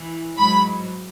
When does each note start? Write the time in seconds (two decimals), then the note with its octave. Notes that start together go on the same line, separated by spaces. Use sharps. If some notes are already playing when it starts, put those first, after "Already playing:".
Already playing: E3
0.37 G#2 F#3 B5